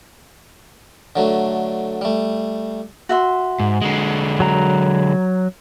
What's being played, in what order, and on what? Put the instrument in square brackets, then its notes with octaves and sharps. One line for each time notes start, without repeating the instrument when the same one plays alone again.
[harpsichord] D3 F#3 A3
G3 A3
[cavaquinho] F#4 E5 C6
[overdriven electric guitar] G#2
D3 G#3
[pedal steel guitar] F#3 A#5 [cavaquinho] A#4